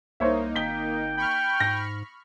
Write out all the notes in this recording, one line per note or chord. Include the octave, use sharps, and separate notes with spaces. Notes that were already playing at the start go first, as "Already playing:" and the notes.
C2 A#3 D#4 C5 C#5 E5
G#1 G5 B6 G7
G5 B5 C#6 F6
G#2 A#6